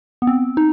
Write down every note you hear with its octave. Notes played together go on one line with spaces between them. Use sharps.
B3
C4
D#4